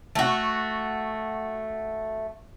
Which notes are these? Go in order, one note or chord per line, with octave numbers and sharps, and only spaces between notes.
A3 F#4